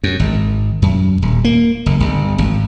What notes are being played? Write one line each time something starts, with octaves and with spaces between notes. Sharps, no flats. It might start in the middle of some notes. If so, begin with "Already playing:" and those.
F#2
G#1
F#2
D#1
A#3
F#1
G1
G#1